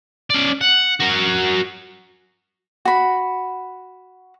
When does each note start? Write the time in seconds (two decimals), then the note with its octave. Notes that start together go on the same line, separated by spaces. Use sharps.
0.30 C#4 D5
0.61 F#5
1.00 F#4 A#4
2.85 F#4 B5